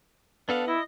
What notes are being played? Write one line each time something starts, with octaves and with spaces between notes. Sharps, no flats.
B3 D4 A4 F5
E4 D#5